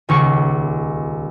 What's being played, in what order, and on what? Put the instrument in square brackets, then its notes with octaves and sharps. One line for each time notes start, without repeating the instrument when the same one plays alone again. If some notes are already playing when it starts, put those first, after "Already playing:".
[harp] D#1 C#2 C#6 C#7